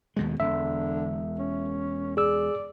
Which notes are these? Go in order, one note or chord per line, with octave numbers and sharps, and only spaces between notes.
D#2 B2 G#3
E1 D3 E5
C#4
G#4 D5 E6